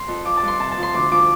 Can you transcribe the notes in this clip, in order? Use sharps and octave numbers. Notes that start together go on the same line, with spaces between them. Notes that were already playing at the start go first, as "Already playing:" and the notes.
Already playing: C6
F2
F3 D6
A5
G2
C6
C3 A5
A5
F3
C6
D2 D6
F3 D6